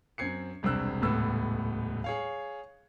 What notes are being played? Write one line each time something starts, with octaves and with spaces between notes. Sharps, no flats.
F#2 C4 G#6 C7 C#7
E1 C2 G2 C4 E6 F#6
D#1 C#2 A2 B3 E6
G#4 C#5 F5